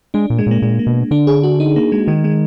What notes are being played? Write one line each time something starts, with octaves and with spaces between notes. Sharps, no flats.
G#3 D4
A#2
G#3
A#2 A#3
A#2 G#3
A#3
B2
D3 D4
G#4
F#4
D#4
A#3
G#3
D#3 G#3
G#3